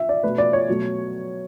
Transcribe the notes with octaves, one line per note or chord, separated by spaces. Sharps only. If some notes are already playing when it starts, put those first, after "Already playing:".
Already playing: E5
D5
B2 A3 B4
D5
C#5
B2 F#3 A3